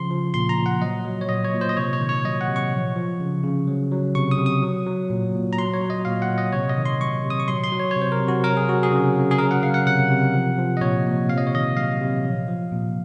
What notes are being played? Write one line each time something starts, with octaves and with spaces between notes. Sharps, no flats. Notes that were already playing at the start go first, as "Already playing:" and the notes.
Already playing: C#3 F3 C6
F3
A#2 C6
A#5
A#2
F#5
F#3 D#5
F#3
C#5
A#2 D#5
C#5
A#2
C5
D#5
C3 C#5
C#5
D#3
C#5
F#3 D#5
F#5
C3
C#6
F3
F3
C#3
C#3
F#3
F#3
C3 C#6
D#6
C3
D#6
F#3
F#3
A#2
A#2
A#5
F#3 C6
C#5
F#3
D#5
A#2 F5
F#5
A#2
D#5
C3 C#5
D#5
D#3
C6
F#3 C#6
C3
D#6
C#6
F#3 C6
C6
F#3
C#5
C3 C#5
C5
A#4
C3
F#4
F#3 A#4
G#4
F#3 F#4
G#4
C#3
C#3
G#4
F#3 A#4
F#5
F#3 F5
F#5
C3 F#5
C3
F3
F3
D#5
A#2 C#5
A#2
C3 F5
D#5
C#5
D#3 D#5
F#3 F5
C3
F3
F3
A#2